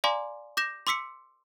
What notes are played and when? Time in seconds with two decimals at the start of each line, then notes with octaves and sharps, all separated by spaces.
0.04 D5 F5 G#5 A#5 C6 D6
0.57 D6 G6 A#6 E7
0.87 C6 D6 E6 B6 C#7